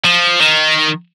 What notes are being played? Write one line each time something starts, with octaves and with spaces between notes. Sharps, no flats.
F3
D#3